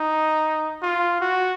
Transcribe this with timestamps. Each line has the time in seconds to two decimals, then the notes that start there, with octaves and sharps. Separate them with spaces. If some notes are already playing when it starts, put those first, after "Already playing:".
Already playing: D#4
0.82 F4
1.21 F#4